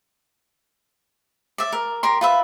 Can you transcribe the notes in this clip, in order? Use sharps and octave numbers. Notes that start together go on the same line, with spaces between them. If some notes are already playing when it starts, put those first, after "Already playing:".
D5 E5
A#4
G4 A#4 C6
F4 B4 E5